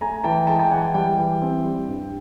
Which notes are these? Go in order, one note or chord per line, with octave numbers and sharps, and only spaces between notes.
A3 G#5 A#5
E3 G5 A5
G#3 G5 A5
G5 A5
E3 F#5 G#5
G5
G3 G5
E3
C4
G3
G2